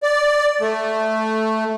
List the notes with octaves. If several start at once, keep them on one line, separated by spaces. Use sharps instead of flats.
D5
A3